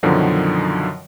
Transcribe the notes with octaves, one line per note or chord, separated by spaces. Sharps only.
F#2 B2 D3 D#3 F3 F#3